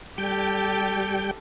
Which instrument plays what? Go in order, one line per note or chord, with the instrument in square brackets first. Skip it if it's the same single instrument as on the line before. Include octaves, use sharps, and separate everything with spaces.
[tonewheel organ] G3 G5 [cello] G4 A4